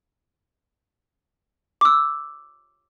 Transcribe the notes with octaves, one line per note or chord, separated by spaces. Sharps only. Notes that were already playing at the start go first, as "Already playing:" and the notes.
D6 E6